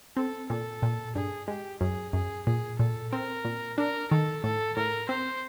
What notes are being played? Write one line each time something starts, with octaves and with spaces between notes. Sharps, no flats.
C4 A4
A#2 A4
A#2
G2 G#4
G#3 G4
F#2 G#4
F#2 G#4
A#2 G#4
A#2 A4
C4 A#4
A#2
D4 A#4
D#3 A4
A2 A4
A2 A#4
C4 C5